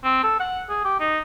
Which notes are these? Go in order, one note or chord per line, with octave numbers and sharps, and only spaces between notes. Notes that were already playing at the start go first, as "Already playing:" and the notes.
C4
A4
F#5
G#4
G4
D#4